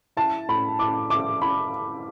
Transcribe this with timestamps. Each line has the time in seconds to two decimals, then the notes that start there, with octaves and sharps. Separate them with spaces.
0.17 E4 A5
0.48 A2 B5
0.79 A2 D6
1.10 E4 D6
1.42 E4 B5